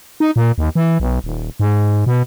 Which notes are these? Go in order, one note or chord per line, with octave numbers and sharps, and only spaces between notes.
D#4
A#2
D#2
E3
B1
D#1
G#2
B2